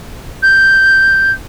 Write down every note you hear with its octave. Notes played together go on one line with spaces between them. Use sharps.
G6